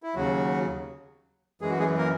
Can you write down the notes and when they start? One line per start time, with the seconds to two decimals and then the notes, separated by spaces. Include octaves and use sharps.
0.03 E4
0.15 D#2 C#3 F#3 F#4
1.61 F#2 E3 G#3 G#4
1.70 F#4
1.79 G#3 G#4
1.97 A#3 A#4